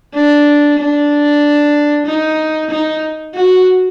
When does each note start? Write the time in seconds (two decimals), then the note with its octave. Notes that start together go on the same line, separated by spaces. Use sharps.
0.14 D4
0.79 D4
2.06 D#4
2.70 D#4
3.34 F#4